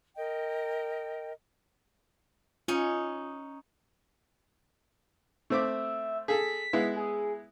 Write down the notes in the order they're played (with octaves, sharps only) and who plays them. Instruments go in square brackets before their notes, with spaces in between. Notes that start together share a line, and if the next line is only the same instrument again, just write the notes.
[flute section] A#4 D#5 G5
[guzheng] C#4 D#4 [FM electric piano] F4
[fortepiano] A3 C4 D6 [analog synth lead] E5
[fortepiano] G#4 A4 [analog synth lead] B6
[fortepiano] G#3 B3 E4
[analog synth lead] G#4